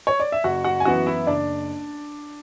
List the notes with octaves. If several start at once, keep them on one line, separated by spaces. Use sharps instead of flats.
C#5
D5
E5
F#1 F#4 F#5
F#4 F#5
G#5
F#2 E3 B3 F#4 F#5
E4 E5
F#1 D4 D5